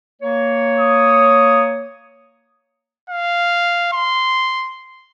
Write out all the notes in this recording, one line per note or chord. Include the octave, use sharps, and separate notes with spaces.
A#3 C#5
D#6
F5
C6